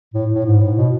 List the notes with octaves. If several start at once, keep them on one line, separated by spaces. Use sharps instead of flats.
A2
A2
G#2
A2
B2